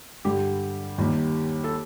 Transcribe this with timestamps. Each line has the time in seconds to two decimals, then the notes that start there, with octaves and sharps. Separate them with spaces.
0.25 G2 D3 G3 G4
0.98 D#2 D#3 G3
1.64 A4